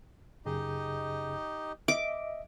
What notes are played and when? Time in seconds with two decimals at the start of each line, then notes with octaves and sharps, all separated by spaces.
0.46 F#2 C#3 D#4 G4 G#4 D#5
1.88 D#5 E5 D6